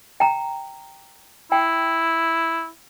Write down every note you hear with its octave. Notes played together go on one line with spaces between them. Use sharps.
G5 A#5
E4 G5